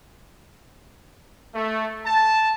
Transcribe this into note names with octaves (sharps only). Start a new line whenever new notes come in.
A3
A5